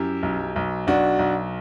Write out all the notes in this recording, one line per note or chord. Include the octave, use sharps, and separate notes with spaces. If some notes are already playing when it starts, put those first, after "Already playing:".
Already playing: F#2 E4 G4
B1
B1
B1 D4 F#4
B1